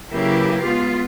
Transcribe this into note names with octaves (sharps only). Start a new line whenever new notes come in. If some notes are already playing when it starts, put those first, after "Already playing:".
C#3 F#3 A#3 E4 G4 B4
G#3 B3 F4